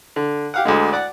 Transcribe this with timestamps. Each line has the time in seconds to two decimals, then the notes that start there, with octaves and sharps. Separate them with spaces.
0.16 D3
0.54 G4 F5 F#5
0.65 D2 D3 G#3
0.93 D5 F#5 D6